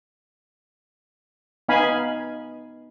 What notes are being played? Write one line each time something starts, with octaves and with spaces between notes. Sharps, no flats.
B3 D#4 F5 G#5 B5